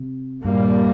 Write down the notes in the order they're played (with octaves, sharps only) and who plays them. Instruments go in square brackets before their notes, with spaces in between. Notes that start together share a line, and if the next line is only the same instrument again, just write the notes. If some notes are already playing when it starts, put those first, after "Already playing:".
Already playing: [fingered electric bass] C3
[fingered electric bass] G2 [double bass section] A#2 G3 A#3